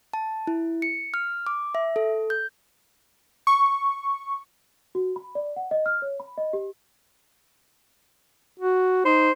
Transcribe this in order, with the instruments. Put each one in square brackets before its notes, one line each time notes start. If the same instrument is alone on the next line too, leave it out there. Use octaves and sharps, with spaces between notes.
[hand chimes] A5
E4
C#7
F6
D6
E5
A4
G6
[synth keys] C#6
[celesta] F#4
B5
D5
F#5
D#5
F6
C#5
B5
D#5
G4
[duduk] F#4
[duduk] D#4 [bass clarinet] C5